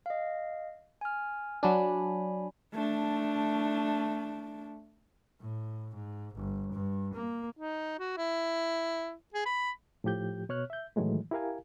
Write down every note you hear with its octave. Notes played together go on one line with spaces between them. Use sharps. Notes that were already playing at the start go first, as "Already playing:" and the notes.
D#5 F5
G#5 F6
F#3 D4 G#5 B5
A3 D4
A2
G#2
G1
G2
A#3
D#4
F#4
E4
G#4
B5
A2 F3 G4 G6
B2 C#5 F6 F#6
E5 G6
A2 D#3 E3 F#3 G#3 A3
E4 G4 A#4 F5 G#5